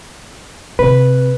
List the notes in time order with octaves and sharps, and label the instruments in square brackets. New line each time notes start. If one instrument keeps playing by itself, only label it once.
[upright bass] C3 [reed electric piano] B4